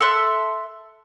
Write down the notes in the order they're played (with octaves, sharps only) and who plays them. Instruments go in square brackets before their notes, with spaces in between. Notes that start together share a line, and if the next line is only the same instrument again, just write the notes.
[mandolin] A4 E5 C6 F#6